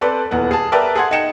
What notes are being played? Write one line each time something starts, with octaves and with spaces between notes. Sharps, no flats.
C4 A4 B4 C5 D5
D#1 E2 B3 F#5
G#4 A5
A#4 B4 D5 E5 G5 A5
G#4 A4 F#5 C6 G#6
D#4 G5 C#7 E7